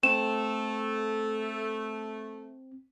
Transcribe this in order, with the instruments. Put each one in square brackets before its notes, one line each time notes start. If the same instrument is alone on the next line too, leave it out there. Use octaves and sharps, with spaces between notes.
[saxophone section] A3 [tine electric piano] C4 [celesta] E7